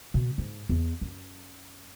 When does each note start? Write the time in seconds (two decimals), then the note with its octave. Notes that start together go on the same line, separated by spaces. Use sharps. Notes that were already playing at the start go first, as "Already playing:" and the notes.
0.14 B2
0.38 G#2
0.69 E2
1.01 F#2